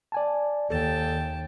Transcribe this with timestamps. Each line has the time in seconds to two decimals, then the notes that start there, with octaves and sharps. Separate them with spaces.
0.12 D5 G#5 A5
0.70 D#2 A4 G5 A5